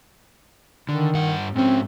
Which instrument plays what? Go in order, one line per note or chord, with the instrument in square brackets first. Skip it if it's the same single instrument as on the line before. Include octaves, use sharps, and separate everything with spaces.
[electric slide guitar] D3 [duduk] D#3
[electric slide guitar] G2 F#5
[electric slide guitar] G#2 C#4 [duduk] C4